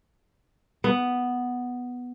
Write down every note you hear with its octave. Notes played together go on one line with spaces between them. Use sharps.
B3